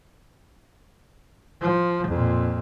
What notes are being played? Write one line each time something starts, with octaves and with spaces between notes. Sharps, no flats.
F3
F2 A#2